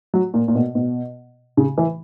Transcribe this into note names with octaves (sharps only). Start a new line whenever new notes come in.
F#3
A#2
A#2
B2
B2
C#3
E3